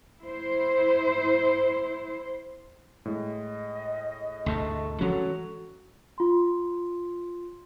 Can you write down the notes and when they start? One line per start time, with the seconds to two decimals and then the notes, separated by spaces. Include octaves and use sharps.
0.22 E4 C5
3.05 A2 G#3 D#5
4.46 D2 G#2 B2 A3
5.01 E3 F#3 G#3 C#4 F#4 A4
6.18 F4 C6